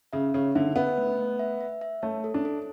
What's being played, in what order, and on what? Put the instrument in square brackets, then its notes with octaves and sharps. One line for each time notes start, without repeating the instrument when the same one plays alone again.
[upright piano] C#3 [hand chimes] E5
[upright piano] C#3 [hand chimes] C#5
[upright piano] D3 [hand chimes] E5
[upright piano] B3 [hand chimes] E5
[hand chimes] A3
A3
E5
E5
E5
[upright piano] A3 [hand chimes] C#5
[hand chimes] A4
[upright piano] D4
[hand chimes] A4